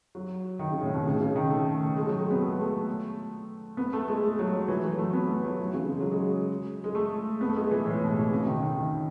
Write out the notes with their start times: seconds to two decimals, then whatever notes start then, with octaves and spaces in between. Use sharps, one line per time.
0.15 F#3
0.59 D#3
0.71 C#3
0.82 A2
0.94 B2
1.05 C#3
1.21 C#3
1.36 D#3
1.50 A3
1.96 G#3
2.07 F#3
2.19 G#3
2.31 B3
2.41 A3
2.51 G#3
2.61 A3
3.77 B3
3.93 A3
4.08 G#3
4.23 G#3
4.39 F#3
4.54 F#3
4.68 E3
4.84 F#3
4.98 A3
5.13 B3
5.30 A3
5.44 F#3
5.59 E3
5.74 C#3
5.90 G#3
6.01 F#3
6.11 G#3
6.84 G#3
6.95 A3
7.41 B3
7.49 A3
7.56 G#3
7.71 E3
7.86 A2
8.01 B2
8.16 B2
8.32 C#3
8.46 D#3
8.62 D#3
8.76 D#3